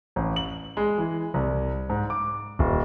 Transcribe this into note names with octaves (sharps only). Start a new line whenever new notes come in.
A1
F#7
G#3
E3
C2
G#2
D6
D#1